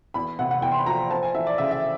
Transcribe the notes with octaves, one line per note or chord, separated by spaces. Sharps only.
E2 B5
C3 F#5
F#5
E2 G5
C6
B5
F3 A#5
C4 A5
G#5
E3 E5
D5
C#3 E5
E5